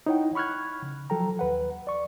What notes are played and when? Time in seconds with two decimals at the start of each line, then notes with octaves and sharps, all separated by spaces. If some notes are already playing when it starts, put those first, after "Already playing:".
0.06 D#4 E4 C#5 D#5 F#5 G5
0.35 B5 C#6 F6 F#6 G#6
0.83 C#3
1.10 F3 F#3 A4 G5 A#5
1.39 D#2 B4 F#5
1.87 D5 C#6